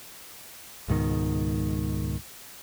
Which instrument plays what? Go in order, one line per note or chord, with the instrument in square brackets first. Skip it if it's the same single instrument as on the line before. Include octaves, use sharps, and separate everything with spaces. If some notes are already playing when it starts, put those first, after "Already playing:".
[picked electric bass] C#2 G#2 B2 D#3